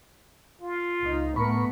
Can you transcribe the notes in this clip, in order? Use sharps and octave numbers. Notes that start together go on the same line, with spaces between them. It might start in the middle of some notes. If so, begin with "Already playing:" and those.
F4
C#2 D#4
A2 A3 B3 A#4 B5 C#6